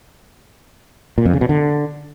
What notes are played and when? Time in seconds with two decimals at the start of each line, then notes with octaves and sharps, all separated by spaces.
1.18 A#2
1.26 F2
1.33 C#3
1.41 B2
1.49 D3